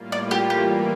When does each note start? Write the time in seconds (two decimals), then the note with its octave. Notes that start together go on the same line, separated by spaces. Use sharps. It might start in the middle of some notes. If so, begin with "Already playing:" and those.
Already playing: A2 G3 A#3 F4
0.12 D5
0.31 G4
0.50 E3 G3 A#3 G4